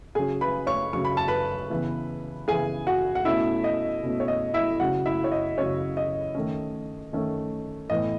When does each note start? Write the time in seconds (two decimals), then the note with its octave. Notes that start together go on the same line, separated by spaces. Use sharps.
0.15 C#3 F#3 C#4 G#4 G#5
0.41 B4 B5
0.67 C#5 C#6
0.93 C#3 F#3 C#4 C#6
1.05 B5
1.17 A5
1.28 B4 B5
1.70 C#3 E3 B3
2.48 C#3 E3 B3 G#4 G#5
2.87 F#4 F#5
3.15 F#5
3.25 B2 A3 C#4 E4 E5
3.64 D#5
4.03 B2 A3 C#4
4.20 C#5
4.28 D#5
4.54 E4 E5
4.80 C#3 F#3 C#4 F#4 F#5
5.06 E4 E5
5.24 C#5
5.32 D#5
5.58 C#3 F#3 C#4 C#5
5.97 D#5
6.35 D#3 A3 C#4
7.13 D#3 A3 C#4
7.90 A2 E3 B3 D#5